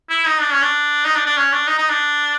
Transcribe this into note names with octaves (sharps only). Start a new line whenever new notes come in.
E4
D#4
D4
C#4
D4
D#4
D4
D4
C#4
D4
D#4
D#4
D4